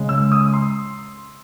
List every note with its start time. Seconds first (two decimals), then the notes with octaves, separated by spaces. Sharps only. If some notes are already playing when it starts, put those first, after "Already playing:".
Already playing: C#3 G#3
0.09 E6
0.32 D#6
0.54 C6